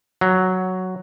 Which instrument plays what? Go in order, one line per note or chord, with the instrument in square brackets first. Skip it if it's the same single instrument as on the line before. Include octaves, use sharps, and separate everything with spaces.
[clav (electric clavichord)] F#3